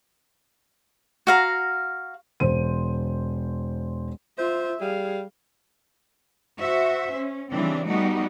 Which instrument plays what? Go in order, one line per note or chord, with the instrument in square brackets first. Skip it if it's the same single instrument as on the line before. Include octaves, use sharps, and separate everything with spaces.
[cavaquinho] F#4 F5 A#5
[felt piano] E1 C5 D#7
[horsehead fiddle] F4 E5 [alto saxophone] C5
[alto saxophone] G3 [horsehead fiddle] G#4 F5
[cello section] F#4 C5 E5
C#4
C#3 E3 G3 C4 D4
G3 A3 B3 D#4 F#4